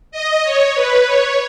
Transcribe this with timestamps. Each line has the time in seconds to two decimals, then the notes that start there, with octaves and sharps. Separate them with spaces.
0.11 D#5
0.44 C#5
0.75 B4
1.06 C#5